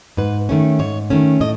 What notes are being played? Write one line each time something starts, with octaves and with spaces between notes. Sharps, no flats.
G#2 B4
D#3 A3 C#4
G#2 C#5
D#3 A3 C#4
A2 D#5